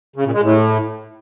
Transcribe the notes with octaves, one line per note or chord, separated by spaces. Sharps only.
C#3
A#2
G#3
A2